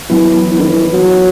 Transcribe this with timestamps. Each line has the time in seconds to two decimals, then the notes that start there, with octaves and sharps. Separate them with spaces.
0.10 E3 F#3 B3 E4
0.51 E3
0.60 D#3
0.69 E3
0.94 F#3